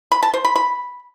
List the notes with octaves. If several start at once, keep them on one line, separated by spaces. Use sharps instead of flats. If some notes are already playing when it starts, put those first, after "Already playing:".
B5
A5
C5
B5
B5